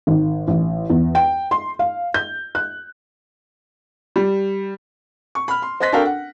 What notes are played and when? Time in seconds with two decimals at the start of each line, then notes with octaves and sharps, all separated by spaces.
0.07 G#1
0.47 A1
0.90 E2
1.15 G5
1.51 C6
1.79 F5
2.14 G6
2.55 F#6
4.16 G3
5.35 C#6
5.48 B5 F6
5.62 C6
5.80 C5 D#5 C6 F#6 A#6 B6
5.92 D4 F#4 A4 A#4 F5 G5
6.05 F#5